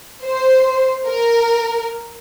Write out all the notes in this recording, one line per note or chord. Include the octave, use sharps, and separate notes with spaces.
C5
A#4